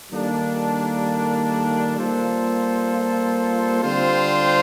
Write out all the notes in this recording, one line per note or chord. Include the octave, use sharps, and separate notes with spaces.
D#3 G3 A#3 D4 A4
G3 A#3 F4 A4 C5
D3 G3 C4 F4 C5